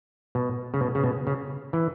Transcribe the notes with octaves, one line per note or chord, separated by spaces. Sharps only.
B2
C#3
B2
C#3
B2
C#3
E3